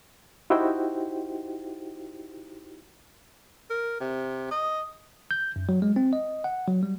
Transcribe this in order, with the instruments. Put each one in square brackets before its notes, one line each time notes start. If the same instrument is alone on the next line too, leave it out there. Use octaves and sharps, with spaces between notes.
[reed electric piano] D#4 E4 F#4 G4 C5 G5
[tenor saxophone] A#4
C3
D#5
[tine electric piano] G6
F#2
F#3
G#3
C4
D#5
F#5
F#3
G3